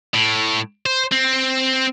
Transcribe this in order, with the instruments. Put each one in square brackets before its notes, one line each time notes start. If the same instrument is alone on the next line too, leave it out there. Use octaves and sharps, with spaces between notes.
[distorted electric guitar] A2
C5
C4